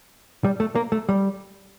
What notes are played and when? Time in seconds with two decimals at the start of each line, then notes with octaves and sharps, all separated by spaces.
0.45 G3
0.60 A3
0.75 A#3
0.92 A3
1.09 G3